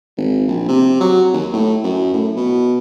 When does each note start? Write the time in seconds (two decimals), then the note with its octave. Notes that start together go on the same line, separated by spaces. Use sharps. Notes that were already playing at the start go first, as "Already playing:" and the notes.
0.17 G#1
0.47 A#1
0.68 C3
1.01 F#3
1.33 D#2
1.53 A2
1.84 F#2
2.13 A2
2.36 B2